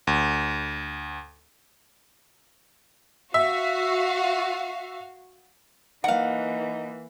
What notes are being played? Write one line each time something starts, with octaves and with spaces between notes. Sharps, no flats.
D2
F#4 E5 F5
E3 A#3 D#4 A#4 F5 F#5